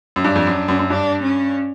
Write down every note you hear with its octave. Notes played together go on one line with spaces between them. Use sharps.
F#2
G2 D4
F2
F#2
F#2
F#2
G2 D4
C#4